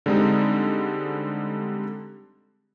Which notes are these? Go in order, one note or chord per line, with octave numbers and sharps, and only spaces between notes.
D3 G3 G#3 C4 D#4